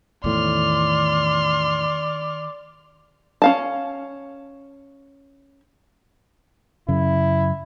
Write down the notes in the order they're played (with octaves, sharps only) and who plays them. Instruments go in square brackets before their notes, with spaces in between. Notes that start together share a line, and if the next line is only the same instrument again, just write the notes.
[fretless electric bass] E2 A2 [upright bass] D#3 [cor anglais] D5 [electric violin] C6 F6
[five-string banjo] C#4 F5 A5
[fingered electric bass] F#2 C#3 [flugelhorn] E4